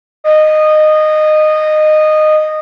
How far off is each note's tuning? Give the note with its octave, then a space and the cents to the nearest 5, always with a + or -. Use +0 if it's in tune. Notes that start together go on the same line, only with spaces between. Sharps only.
D#5 -15